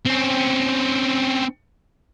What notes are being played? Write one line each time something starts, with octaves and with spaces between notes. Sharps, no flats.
C4 C#4